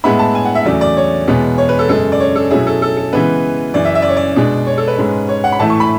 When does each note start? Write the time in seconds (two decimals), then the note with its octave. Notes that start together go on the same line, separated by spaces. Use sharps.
0.04 A2 G#3 B3 E4 B5
0.19 A5
0.35 G#5
0.45 F#5
0.55 E5
0.65 E2 C#3 F#3 A3 D5
0.81 D5
0.97 C#5
1.28 E2 B2 G#3 B3
1.58 C#5
1.69 B4
1.79 A4
1.89 F#2 C#3 G#3 A4
2.12 D5
2.20 C#5
2.36 A4
2.51 B2 F#3 C#4 E4 G#4
2.67 A4
2.82 A4
2.97 A4
3.13 C#3 E3 G#3 B3 B4
3.74 F#2 C#3 E3 D5
3.85 E5
3.95 E5
4.02 D5
4.09 C#5
4.17 D5
4.36 B2 G#3 D4
4.67 C#5
4.78 A4
4.88 B4
4.97 G#2 G#3 C#4
5.29 C#5
5.44 F#5
5.52 B5
5.59 A2 E3 A3 E4 A5
5.70 C#6
5.80 B5